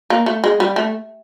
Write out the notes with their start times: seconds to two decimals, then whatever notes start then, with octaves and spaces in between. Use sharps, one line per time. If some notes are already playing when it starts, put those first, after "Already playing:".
0.10 A#3
0.26 A3
0.44 G#3
0.60 G3
0.76 A3